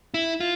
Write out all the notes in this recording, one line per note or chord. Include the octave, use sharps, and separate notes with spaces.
E4
F4